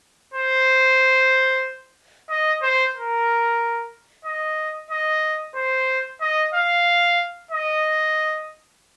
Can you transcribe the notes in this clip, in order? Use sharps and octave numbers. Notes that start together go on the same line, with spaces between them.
C5
D#5
C5
A#4
D#5
D#5
C5
D#5
F5
D#5